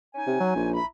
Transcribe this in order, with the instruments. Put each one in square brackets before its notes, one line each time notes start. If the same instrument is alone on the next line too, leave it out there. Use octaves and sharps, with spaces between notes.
[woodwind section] C#4 D#4 G#5
[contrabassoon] C3
F#3
A#1
[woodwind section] E4 A#5 B5